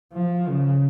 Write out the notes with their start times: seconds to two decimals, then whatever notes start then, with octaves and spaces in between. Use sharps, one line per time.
0.13 F3
0.48 C#3